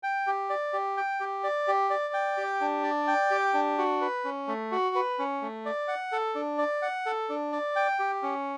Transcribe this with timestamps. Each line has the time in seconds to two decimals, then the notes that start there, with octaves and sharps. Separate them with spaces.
0.03 G5
0.27 G4
0.50 D5
0.73 G4
0.97 G5
1.20 G4
1.44 D5
1.68 G4
1.90 D5
2.14 G5
2.37 G4
2.61 D4
2.83 D5
3.07 G5
3.31 G4
3.54 D4
3.78 F#4
4.01 B4
4.25 C#4
4.48 A3
4.72 F#4
4.95 B4
5.19 C#4
5.42 A3
5.66 D5
5.88 F#5
6.12 A4
6.35 D4
6.58 D5
6.82 F#5
7.06 A4
7.29 D4
7.52 D5
7.76 G5
7.99 G4
8.23 C#4